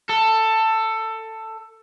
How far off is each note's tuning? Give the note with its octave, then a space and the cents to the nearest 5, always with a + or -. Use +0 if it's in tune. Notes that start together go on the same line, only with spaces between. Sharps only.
A4 +15